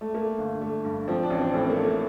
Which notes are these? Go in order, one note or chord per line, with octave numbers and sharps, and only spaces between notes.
A3
A3 A#3
G1
A3
G2
F3 C4
D4
A1
C4
A2 C4
C4
A#3
A3
A#3